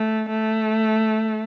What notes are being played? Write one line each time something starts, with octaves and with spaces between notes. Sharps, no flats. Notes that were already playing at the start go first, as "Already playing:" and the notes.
Already playing: A3
A3